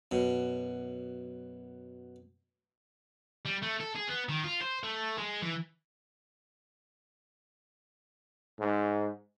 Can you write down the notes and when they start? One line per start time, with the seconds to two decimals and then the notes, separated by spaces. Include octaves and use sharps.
0.11 F#2 B2
3.46 G3
3.63 A3
3.81 A4
3.96 G#4
4.09 B3
4.29 D#3
4.44 F4
4.62 C5
4.84 A3
5.18 G#3
5.42 E3
8.60 G#2